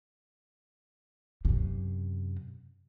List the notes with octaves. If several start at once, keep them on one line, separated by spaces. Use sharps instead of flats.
F#2 C3